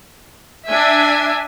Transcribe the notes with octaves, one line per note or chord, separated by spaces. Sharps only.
D4 E5 G#5